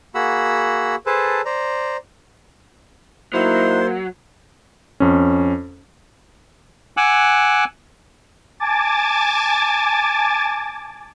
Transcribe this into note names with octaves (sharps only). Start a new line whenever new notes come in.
A#3 F#4 G#4 F#5 B5 E6
G#4 A4 B4 C5 A5
C5 D5 A#5
F#3 A#3 D#4 E4 C5
F2 C#4
F#5 G#5 D6 E6 F#6
G#5 A5 D6 A6